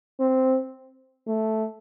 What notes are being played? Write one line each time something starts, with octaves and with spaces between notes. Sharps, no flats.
C4
A3